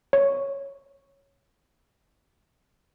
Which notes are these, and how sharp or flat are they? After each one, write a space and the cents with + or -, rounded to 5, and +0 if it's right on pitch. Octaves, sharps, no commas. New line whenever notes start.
C#5 +0